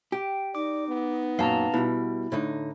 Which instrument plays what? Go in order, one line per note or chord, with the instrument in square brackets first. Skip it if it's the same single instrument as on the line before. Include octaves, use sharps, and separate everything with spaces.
[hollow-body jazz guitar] G4 [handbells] G5
[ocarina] D#4 [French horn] D5 [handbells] D6
[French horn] B3
[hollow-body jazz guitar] F#2 A#2 [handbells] F5 A5 A#5
[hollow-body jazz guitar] B2 G3 [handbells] E4
[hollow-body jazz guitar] A2 D3 D#4